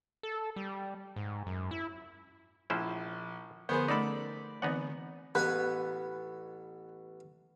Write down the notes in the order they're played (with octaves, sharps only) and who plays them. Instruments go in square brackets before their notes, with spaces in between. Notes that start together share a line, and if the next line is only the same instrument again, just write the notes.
[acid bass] A4
G3
G#2
F#2
E4
[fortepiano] A#1 [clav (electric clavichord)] C#4 E4 C5
[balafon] D3 F3 A#4 [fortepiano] B3 G#4 C5
[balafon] A3 C#4 [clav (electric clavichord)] D#4 A4 [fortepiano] D5 B5
[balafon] D3 E3 C4 [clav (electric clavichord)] B3 D#4 F#5
[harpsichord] A1 B3 G#5 [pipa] B4